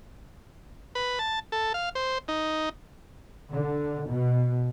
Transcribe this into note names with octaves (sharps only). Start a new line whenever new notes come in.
B4
A5
A4
F5
C5
D#4
D3
B2